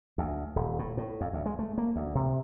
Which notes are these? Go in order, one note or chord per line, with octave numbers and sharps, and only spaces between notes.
D2
D#1
A2
A2
F2
D2
G#3
A3
A#3
D2
C3